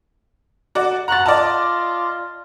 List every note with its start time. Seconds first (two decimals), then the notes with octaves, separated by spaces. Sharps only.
0.75 F#4 D5
1.08 F#5 A#5 C#6 A6
1.26 F4 D5 D#5 A5